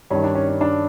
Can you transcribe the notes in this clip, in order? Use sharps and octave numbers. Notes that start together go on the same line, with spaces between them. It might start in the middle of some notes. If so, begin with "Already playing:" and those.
G2 D#3 C#4
D4
C#4
C#4
D4